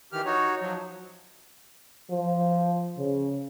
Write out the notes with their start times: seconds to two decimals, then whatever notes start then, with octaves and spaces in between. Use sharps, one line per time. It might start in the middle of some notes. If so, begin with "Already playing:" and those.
0.12 D#3 E3 G4 F6
0.25 D#4 F#4 C#5
0.60 F3 F#3
2.10 F3
2.97 C#3